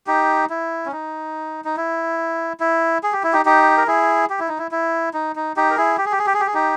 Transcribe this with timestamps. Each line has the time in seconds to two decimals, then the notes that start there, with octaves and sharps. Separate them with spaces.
0.07 D#4 G4
0.50 E4
0.86 C#4
0.92 D#4
1.65 D#4
1.77 E4
2.60 E4
3.03 G#4
3.13 G4
3.24 E4
3.33 D#4 G4
3.45 D#4 G4
3.77 A#4
3.87 E4 G#4
4.30 G4
4.40 E4
4.49 D#4
4.58 E4
4.71 E4
5.14 D#4
5.36 D#4
5.57 D#4 G4
5.70 A#4
5.77 E4 G#4
5.98 G4
6.06 G#4
6.12 G4
6.19 G#4
6.26 G4
6.34 G#4
6.40 G4
6.47 G#4
6.54 D#4 G4